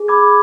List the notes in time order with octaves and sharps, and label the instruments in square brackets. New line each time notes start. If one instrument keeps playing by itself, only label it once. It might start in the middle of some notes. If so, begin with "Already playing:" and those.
Already playing: [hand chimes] G#4
[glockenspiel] B5 D6 G#6